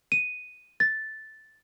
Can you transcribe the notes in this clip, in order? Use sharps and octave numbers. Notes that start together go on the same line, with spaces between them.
D#7
A6